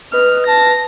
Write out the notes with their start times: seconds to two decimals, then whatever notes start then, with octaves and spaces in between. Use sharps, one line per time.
0.13 B4 D#5 F6
0.47 A5 A#6